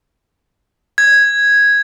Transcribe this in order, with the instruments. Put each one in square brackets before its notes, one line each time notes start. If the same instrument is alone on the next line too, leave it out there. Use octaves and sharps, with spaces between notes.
[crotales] G#6